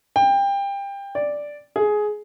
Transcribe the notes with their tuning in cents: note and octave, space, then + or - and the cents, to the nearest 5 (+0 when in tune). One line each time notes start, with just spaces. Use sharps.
G5 +25
D5 +0
G#4 +15